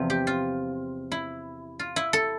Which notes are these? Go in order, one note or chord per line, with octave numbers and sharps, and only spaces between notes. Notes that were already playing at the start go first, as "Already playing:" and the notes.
Already playing: E2 C3 F3
G4
F4
E4
F4
E4
A4